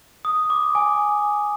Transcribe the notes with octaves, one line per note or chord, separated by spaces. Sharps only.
D#6
D6
G#5